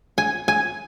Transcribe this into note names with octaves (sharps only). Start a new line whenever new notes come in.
G#5
G#5